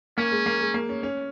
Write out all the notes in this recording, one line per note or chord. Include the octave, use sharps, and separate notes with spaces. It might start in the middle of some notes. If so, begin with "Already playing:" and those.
A#3 C#4
G#3
A#3
G#3
A#3
C#4
C#4